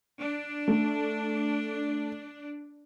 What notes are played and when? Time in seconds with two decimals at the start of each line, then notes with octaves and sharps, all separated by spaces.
0.19 D4
0.68 A3